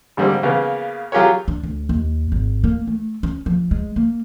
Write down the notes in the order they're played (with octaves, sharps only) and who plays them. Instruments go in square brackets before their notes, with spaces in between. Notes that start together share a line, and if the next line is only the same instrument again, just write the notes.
[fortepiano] G#1 D3 G3 A#3 C4
C#3 A#3 B3
F#3 F4 G4 G#4 A#4 C#5
[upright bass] D4
D2
D#2
G#1
A#3
A3
C#4
F3
G#3
A#3